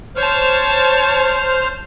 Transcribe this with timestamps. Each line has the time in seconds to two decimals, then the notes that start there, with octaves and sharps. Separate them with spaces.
0.16 C5 C#5 A5 F6